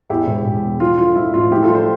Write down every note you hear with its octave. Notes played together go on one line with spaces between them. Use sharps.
E2 E4 G4
E1
E1
E2
F3 F4
D3 F4
F3 E4
A1 F4
F3 E4 G4
F4 A4
F3
A4 C5